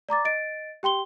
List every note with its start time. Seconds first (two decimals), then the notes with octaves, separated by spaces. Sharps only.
0.09 D5 A#5 D6 A6
0.25 D#5 A6 D7
0.83 G4 G5 C6 G7